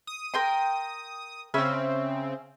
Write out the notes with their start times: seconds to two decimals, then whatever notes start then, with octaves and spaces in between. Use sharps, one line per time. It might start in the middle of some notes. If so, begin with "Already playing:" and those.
0.07 D#6
0.34 A#4 G5 C6
1.54 C#3 C4 C#4 E5 B5